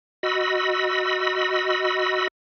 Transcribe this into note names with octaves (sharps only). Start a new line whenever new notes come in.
F#4 D#5 B5 E6